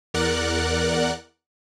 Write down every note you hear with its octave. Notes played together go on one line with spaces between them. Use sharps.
E2 A#4 D5 F#5 F#6